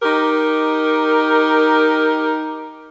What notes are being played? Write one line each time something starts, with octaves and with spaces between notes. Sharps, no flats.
D#4 G4 A#4